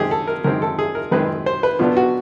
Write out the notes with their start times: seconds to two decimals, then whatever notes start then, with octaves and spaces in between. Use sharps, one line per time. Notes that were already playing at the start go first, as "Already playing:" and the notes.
Already playing: F#2 D#3 G#3 C4 G4 G#4
0.11 A4
0.27 A#4
0.44 F#2 D#3 G#3 C4 A#4
0.62 A4
0.79 G#4
0.95 A#4
1.11 F#2 D#3 G#3 C4 B4
1.46 C5
1.63 B4
1.79 B2 F#3 B3 D4 F4
1.97 F#4